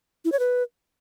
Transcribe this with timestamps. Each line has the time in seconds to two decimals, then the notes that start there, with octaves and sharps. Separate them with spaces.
0.25 E4
0.32 C#5
0.39 B4